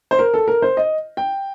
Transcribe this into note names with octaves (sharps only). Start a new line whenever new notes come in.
C5
A#4
A4
A#4
C5
D#5
G5